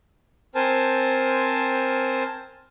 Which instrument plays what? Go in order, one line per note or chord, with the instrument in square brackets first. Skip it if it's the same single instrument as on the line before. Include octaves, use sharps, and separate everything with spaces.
[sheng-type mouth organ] C4 A#4 C5 G#5 A5